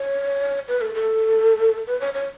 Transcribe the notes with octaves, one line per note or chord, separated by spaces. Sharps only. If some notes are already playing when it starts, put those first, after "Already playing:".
Already playing: C#5
B4
A4
A4
B4
C#5
C#5